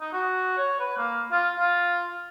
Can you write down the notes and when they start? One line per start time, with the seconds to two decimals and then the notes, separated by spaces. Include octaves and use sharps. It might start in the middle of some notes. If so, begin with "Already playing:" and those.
0.01 D#4
0.13 F#4
0.58 C#5
0.80 B4
0.97 A#3
1.31 F4
1.59 F4